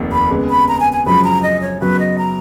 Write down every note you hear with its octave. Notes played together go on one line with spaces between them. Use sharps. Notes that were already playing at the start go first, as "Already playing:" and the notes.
Already playing: F1 D#2 D#3 A#3
B5
C#3 G#3 B3
B5
A#5
G#5
G#5
F#2 C#3 F3 G#3 B5
A#5
D#5
C#5
F#2 C#3 F#3 B3 F#4 B4
D#5
A#5